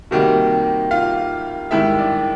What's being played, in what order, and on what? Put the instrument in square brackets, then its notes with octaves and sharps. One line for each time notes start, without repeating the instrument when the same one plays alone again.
[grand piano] C3 D#3 G3 A#3 [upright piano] F#4 F#5
[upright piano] F4 F5
[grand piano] G#2 D#3 G3 [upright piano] E4 E5
[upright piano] D4 D5